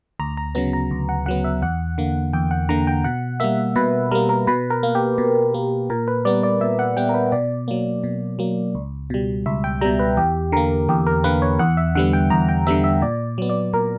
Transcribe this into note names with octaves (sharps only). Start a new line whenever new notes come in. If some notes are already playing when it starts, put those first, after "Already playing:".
D2 A#5
A#5
C#3 F#3 B3 A#5
A#5
D2
F#5
C#3 F#3 B3 F#5
E5
E2 F#5
D3 A#3
E2 G5
F#5
D3 A#3 A#5
G5
B2 F#5
G3 A#3 E5
B2 B4
G3 A#3 A#4
A#4
B2 B4
A#4
A#3
G4
B2
A#3
A#2 A#4
B4
G3 B3 D5
D5
A#2 E5
F#5
G3 B3 G5
A#4
B4
B2 D5
F#3 A#3
B2
F#3 A#3
C#2
B2 G3
C#2 E5
G5
B2 G3 A#5
B4
E2 G4
D3 A#3 A#4
E2 G4
A#4
D3 A#3 B4
C#5
E2 F#5
E5
D3 G3 B3 F#5
G5
E2 A#5
G5
D3 G3 B3 E5
E5
A#2 D5
F#3 B3
D5
A#2 A#4